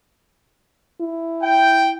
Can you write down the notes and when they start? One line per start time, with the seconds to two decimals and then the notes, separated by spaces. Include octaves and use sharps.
1.01 E4
1.43 G5